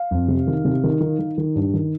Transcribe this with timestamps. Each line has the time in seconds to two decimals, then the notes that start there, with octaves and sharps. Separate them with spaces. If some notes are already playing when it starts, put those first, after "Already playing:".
Already playing: F5
0.11 F2
0.28 C3
0.47 D#3
0.65 C3
0.83 D#3
1.01 D#3
1.19 D#3
1.38 D#3
1.55 G2
1.74 D#3